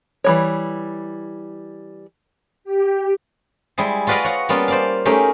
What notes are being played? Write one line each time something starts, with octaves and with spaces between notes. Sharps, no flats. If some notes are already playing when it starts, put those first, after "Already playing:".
E3 G3 C#5
G4
G3 G#3 E4 G#4
F4 F#4 B4 D5 D#5 F5
C#5 F#5
G3 A#3 B3 C#4 F4
C5 D5 F5
A3 C#4 D#4 G4 G#4 A#4